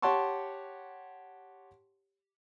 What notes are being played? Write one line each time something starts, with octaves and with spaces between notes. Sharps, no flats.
G4 C#5 F#5 A5 C6 C#6